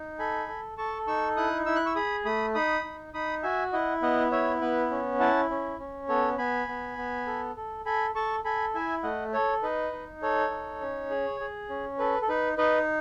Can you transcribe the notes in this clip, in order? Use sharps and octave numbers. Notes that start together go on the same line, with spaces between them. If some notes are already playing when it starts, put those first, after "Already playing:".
Already playing: D#4
A4 G#5 B5
A4
A4 A5 C#6
D#4 C#6 E6
E4 D#6 F#6
E4 E6
F#6
C#6 E6
G#4 B5 D#6
A3 B5 D#6
D#4 B5 D#6
D#4
D#4 B5 D#6
F#4 E5 G#5
E4 D#5 F#5
B3 D#5 F#5
E4 C#5 E5
B3 B4
C#4
E4 F#5 A5
C#4
C#4
B3 A4 C#5
B3 G#5 B5
B3
B3
A4
A4
A4 G#5 B5
A4 A5 C#6
A4 G#5 B5
E4 E5 G#5
A3 D#5 F#5
A4 C#5
D#4 B4 D#5
D#4
A4 C#5
D#4
C#4
G#4
G#4
C#4
A4 B4
A4
D#4 B4
D#4 B4 D#5